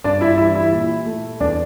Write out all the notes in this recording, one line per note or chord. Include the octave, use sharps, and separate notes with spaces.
G2 D4 D5
E4 E5
E3 G3 E4 E5
E4 E5
A#2
A3
E2 D4 D5